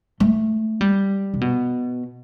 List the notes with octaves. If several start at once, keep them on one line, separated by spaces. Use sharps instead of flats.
A3
G3
C3
B2